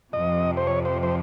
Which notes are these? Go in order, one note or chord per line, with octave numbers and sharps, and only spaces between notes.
F2 C3 F3 D#5
C5
C#5
C5
C5